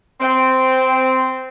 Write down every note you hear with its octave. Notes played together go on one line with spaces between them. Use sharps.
C4